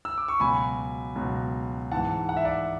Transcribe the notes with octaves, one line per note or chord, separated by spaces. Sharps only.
E6
D6
C#6
C#2 B2 F#3 G#5 B5
C#2 B2 F#3
G#2 E3 F#5 A5
F#5
E5
D5 F#5